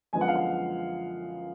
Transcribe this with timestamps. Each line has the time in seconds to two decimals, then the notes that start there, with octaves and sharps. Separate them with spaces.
0.13 F#2 D3 F3 G#3 B3 G#5
0.21 F#5
0.28 F5
0.36 F#5